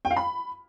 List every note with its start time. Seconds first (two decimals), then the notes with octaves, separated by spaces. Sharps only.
0.05 G5
0.11 F5
0.16 B5